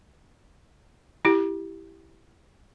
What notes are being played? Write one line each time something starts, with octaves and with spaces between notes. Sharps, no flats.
E4 G4